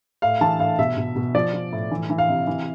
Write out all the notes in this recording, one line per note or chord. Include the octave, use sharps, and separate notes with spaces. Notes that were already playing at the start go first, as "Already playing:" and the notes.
A2 F5
E3 A5
A2 F5
B2 E5
B2
B2
F3 D5
F3
A2
E3
E3
F5
C3
E3